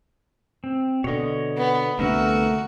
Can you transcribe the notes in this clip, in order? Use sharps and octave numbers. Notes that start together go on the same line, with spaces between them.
C4
B2 D3 C#5 D#5
B3
C2 D3 A3 B3 F#4 A#4 E5